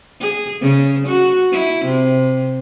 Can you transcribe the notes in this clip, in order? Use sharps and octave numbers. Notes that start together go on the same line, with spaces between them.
G#4
C#3
F#4
E4
C3